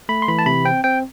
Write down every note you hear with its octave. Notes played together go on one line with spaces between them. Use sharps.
A3 B5
C6
E3 B5
A5
C3 B5
C4 G5
C4 G5